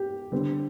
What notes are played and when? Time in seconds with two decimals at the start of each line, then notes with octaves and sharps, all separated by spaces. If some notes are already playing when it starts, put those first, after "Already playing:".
Already playing: G4
0.32 D3 G3 C4